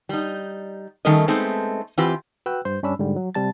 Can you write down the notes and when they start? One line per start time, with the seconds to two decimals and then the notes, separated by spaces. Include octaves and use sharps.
0.09 G3 D#4
1.05 D#3 G3 A3 C#4 A#4 D#5
1.28 G#3 A3 B3 C4 D#4
1.97 E3 C4 F4 G4 B4
2.46 F#4 B4 G5 E6 F#6
2.65 G2 C5 G6
2.83 G2 C#4 D4 B5 E6
2.99 G#2 D3 G3
3.16 F#3
3.35 C3 G3 A5 A6